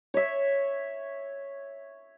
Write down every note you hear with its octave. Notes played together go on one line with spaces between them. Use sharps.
C#5 E5